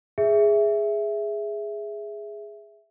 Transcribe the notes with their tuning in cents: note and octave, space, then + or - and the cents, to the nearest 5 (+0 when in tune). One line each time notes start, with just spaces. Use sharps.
G#4 +0 E5 +0